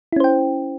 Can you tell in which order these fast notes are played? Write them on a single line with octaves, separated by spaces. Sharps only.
E4 C#4 C5 G5